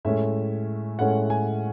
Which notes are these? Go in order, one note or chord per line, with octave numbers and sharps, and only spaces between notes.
A2 G#3 C#4 E5
A2 G#3 C#4 F#5
G#5